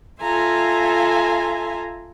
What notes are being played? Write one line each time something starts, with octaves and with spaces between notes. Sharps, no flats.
F4 A4 E5 G#5 A#5 C6